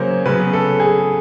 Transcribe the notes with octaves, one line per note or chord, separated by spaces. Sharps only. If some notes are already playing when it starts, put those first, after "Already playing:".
Already playing: C#3 F#3 A#3 C5 C#5
C#3 F#3 B3 B4
A4
G#4